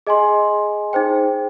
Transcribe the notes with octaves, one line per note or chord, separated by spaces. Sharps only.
G#4 D#5 G#5 C6
D#4 G#4 C5 G5